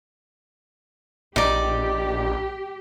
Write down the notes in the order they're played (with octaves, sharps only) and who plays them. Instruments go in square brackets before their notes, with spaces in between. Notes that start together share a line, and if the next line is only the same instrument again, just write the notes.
[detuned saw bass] A#1 [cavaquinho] D#4 D5 [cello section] G4